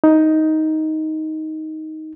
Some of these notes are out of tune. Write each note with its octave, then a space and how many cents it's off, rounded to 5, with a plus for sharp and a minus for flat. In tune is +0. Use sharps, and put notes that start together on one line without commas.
D#4 +10